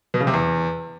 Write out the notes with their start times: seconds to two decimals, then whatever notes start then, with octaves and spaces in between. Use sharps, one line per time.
0.14 B2
0.20 C#3
0.27 C3
0.34 E2